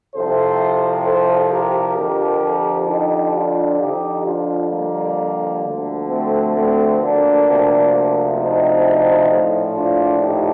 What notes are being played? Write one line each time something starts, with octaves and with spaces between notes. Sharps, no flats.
C2 C3 F3 A4 C5
A4 C5
G4 A#4
F2 D3 F3 G4 A#4
D#4 G4
D4 F4
F2 D3 F3 D#4 G4
D4 F4
G3 A#3
D2 D3 F3
A3 C4
A3 C4
A#3 D4
D2 C3 F3
C4 D#4
A#1 A2 F3
D4 F4
D#4 G4